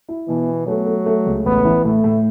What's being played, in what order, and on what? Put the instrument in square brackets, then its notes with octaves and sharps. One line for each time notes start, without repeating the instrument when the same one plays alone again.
[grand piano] E4
[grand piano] B2 [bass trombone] E3
[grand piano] B3
[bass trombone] F#3 [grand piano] A3
[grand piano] A3
A3
C#2
[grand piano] A1 [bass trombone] B3
[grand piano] E3
[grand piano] A2 [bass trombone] A3
[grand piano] A2